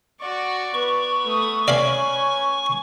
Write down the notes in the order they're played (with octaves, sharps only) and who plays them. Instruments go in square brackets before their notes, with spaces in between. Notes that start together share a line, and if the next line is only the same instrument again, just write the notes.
[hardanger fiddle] F#4 C#6 [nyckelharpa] D5
[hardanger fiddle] B3 B4 [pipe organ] C#6
[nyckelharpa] A3 D#6
[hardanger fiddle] C#4 B4 [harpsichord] D5 F5 B5 [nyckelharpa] G#5